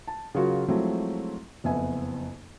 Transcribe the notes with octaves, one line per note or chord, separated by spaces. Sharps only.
A5
C#3 F#3 F4 F#4 A#4
F3 F#3 G#3 A3 C4 E4
F#1 F2 B3 E5 G#5